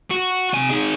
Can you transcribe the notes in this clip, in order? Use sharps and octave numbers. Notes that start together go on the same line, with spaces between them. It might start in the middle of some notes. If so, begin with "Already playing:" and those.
F#4
C3 G#5
D#3 G#4